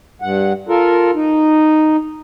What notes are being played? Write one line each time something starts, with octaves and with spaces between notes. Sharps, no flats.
G2 F#5
F4 A4 A#4
D#4